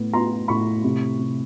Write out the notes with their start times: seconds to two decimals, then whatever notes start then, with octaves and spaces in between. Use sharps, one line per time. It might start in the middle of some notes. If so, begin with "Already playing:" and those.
Already playing: A2 B3
0.13 B3 A#5 C6
0.48 A2 B5 C#6
0.84 C3
1.19 C3